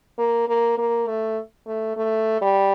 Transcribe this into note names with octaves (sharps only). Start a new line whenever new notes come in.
A#3
A#3
A#3
A3
A3
A3
G3